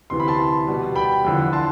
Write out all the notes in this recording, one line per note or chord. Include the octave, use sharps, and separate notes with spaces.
D2 C3 E3 B3 C6
B5
A5 C6
B2 G3 B3
G5 B5
E2 D3 F3
A5 C6